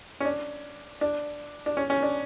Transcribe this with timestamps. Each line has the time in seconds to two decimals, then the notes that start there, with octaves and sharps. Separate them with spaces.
0.20 C#4
0.25 D4
1.01 D4
1.66 D4
1.77 C#4
1.90 C#4
2.03 D4